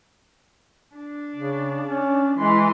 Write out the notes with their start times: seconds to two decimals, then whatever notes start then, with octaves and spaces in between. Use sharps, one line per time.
0.97 D4
1.35 C#3
1.88 C#4
2.38 E3 G#3 C6